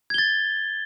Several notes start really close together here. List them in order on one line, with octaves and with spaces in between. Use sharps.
G#6 G7 A6